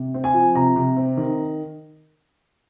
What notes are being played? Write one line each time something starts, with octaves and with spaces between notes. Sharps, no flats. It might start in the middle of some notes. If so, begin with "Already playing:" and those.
Already playing: C3
C4
G#5
F3
C3 A#5
C3
C4
D#3